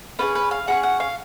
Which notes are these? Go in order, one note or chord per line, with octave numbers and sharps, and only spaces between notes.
C#4 F4 G#4 B4
B4
F5
C#4 F4 G#4 F#5
F#5
F5